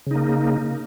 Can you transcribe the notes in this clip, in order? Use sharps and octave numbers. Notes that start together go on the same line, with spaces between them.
C#3 A#3 D#4